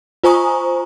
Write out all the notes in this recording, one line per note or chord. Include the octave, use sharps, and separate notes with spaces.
F4 C5 G#5 A#5 C#6 D#6